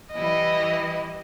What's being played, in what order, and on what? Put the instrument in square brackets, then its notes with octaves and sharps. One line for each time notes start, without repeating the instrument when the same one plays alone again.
[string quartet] E3 G3 E4 [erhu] D#5